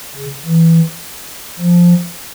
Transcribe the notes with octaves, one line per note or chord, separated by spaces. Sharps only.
C#3
E3
F3